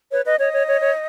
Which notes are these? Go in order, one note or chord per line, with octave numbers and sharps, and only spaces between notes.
B4 C#5
B4 D#5
C#5 D#5
C#5
C#5
C#5